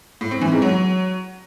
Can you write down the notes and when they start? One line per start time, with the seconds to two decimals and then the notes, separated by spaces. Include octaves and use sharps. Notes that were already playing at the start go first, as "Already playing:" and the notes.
0.21 A2
0.31 C4
0.41 E3
0.52 G#2
0.62 F#3